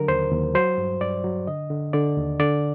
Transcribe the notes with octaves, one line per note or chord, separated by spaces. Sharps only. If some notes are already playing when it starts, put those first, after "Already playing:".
Already playing: D3 F#3 A#4
D#2 C5
D#2
F#3 C5
G2
G2 D5
F#3
D3 D#5
D3
D3 D5
D#2
D3 D5